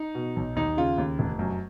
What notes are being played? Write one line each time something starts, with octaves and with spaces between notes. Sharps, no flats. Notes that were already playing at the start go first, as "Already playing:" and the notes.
Already playing: D#4
B2
B1
D#2 D#4
C#3 F4
D#2
F1
F#2